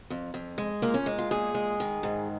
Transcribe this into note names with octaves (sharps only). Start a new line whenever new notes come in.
F2
F2
G#3
A#2 A#3
C#4
G#3
F4
A#2 G#4
G#3
D#3
G#2